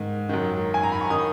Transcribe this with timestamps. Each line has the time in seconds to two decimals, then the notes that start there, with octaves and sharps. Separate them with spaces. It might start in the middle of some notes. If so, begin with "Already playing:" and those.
Already playing: G#2 D#3
0.29 F#2 D#3
0.74 G#5
0.83 A#5
0.92 B5
1.01 C#6
1.10 D#3 D#6